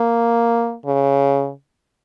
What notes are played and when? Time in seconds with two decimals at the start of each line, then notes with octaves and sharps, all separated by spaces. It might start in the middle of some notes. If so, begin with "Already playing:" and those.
Already playing: A#3
0.86 C#3